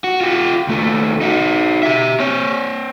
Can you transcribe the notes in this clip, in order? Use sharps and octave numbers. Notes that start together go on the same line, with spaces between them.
F#4
F4 G4
D#2 A3
D#4 F#4
G4 E5
C4 C#5